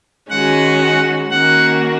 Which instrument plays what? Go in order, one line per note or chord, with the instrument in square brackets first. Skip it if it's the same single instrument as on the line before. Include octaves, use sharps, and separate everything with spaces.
[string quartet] D#3 G#3 C#4 F#4 [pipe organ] F#5
[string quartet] D#3 A#3 C#4 F#4 A#4 [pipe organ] F#5